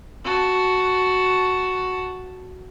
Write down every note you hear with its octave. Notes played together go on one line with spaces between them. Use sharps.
F#4 A5